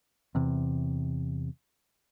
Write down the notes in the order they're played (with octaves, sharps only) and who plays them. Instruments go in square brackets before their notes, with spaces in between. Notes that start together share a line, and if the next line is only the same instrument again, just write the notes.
[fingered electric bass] E2 C3